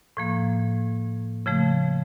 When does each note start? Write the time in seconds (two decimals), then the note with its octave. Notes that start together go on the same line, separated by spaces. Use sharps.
0.17 A2 F3 A#3
1.46 C#3 F3 A3